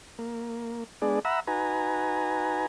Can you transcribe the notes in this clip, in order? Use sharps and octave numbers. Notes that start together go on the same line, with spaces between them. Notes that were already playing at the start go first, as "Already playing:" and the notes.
A#3
G#3 B3 D4 G#4 D5
E5 F#5 A#5 B5 E6
D#4 F#4 B4 G#5 A#5